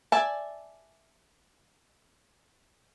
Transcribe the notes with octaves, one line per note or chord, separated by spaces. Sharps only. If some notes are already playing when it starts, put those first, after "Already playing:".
D5 E5 G#5 A5